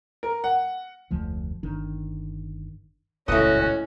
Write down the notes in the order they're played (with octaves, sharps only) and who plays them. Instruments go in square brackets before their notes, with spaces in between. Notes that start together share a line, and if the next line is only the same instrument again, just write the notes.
[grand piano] A#4
F#5
[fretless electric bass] F1 D2 F3 A3
G1 D#3 D4
[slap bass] D#1 C#2 [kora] A2 D#5 [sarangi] C#4 [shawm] F#4